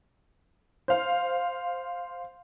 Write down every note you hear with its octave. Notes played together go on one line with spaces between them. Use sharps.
C5 F5